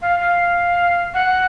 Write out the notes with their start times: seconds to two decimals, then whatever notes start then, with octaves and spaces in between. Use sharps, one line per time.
0.02 F5
0.20 F5
1.14 F#5